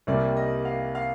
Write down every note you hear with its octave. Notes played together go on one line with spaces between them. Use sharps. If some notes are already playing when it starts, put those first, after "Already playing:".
C2 C3 G3 A#3 D5
D#5
F5
F5